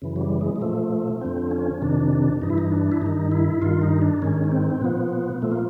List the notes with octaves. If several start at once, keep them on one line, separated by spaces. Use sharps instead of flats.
F#2 C#3 E3
F#3
G3
G#3
G#3
A#2 F3 A3
F2 D3 F3 C4
C#4
F2 C3 D#3 D4
G2 E3 D#4
E4
D#4
D4
E4
G2 D#3 D#4
E4
G2 D#3 F4
D#4
D4
G#2 D#3 C#4
C#4
C4
C4
A#2 F3 B3
A#2 F3 A3
A#3